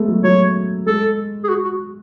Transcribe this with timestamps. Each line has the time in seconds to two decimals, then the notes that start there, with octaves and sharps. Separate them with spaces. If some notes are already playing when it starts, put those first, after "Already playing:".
Already playing: G#3 A3 B3
0.08 F#3
0.24 F#3 C#5
0.87 G#3 A4
1.44 G#4
1.49 F#4
1.64 F#4